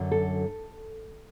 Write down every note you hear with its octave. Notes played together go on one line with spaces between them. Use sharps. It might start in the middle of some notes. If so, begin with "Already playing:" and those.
Already playing: F#2 D3 F#3
A4